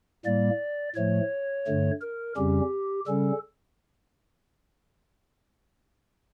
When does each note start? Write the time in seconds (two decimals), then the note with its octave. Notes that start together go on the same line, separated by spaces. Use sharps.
0.25 A2 G3 A#3 D5
0.95 A2 F3 A3 C#5
1.67 G2 D3 A3
2.01 A#4
2.37 F2 C#3 G3 C#4 G4
3.07 C#3 G3 C#4 A4